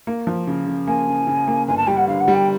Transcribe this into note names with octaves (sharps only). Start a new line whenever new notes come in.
A#3
F3
C#3
C#3
A#3 G#5
C#3
C#3
A#3
G1 G#5
A5
G3 G5
F#5
D3 F5
F#5
G3
G5